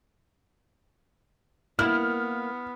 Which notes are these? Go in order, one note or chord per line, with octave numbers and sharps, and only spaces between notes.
A#3 B3 E4 F6